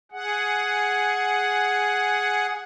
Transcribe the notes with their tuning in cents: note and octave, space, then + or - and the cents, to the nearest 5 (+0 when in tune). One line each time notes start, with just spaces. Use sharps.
G#4 +0 F#5 +0